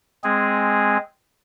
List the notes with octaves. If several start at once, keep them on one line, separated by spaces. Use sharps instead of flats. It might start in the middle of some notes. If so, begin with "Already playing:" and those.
G#3 C4 G#4